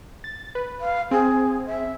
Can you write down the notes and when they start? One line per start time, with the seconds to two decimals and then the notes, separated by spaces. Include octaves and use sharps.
0.24 A6
0.55 B4
0.81 F5
1.11 C4 G#4
1.66 E5